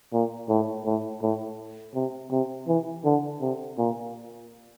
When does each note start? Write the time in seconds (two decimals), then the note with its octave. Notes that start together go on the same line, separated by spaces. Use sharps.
0.12 A#2
0.49 A2
0.85 A2
1.22 A2
1.95 C3
2.31 C3
2.68 E3
3.05 D3
3.41 C3
3.78 A#2